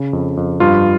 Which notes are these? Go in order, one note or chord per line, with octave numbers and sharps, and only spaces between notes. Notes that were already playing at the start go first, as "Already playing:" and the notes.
Already playing: C#3
F2
F2
G2 F4